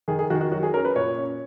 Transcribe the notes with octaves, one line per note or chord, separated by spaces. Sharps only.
D#3 G#4
G#4
D#3 F#4
F#4
F#3 F#4
G#4
C#4 A#4
B4
A#2 C#5
C#4